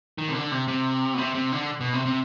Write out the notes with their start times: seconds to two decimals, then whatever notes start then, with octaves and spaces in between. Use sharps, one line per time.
0.18 D#3
0.29 C3
0.35 D3
0.51 C3
0.68 C3
1.14 B2
1.18 C3
1.35 C3
1.52 D3
1.80 B2
1.93 C3
2.06 C3